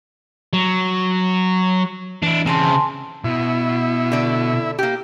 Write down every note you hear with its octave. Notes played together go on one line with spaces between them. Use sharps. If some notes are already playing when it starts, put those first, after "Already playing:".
F#3
E3 D4 E4
C#3 C4 G#5 A5 C6
B2 E4
D3 D5
A#3 G4